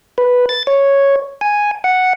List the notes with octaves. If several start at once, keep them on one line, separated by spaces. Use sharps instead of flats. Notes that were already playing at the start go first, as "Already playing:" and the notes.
B4
A6
C#5
G#5
F#5